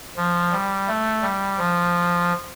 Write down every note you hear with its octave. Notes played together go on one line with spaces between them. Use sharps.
F3
G3
A3
G3
F3